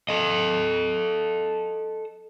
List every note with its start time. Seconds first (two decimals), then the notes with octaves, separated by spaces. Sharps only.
0.09 A4 D#5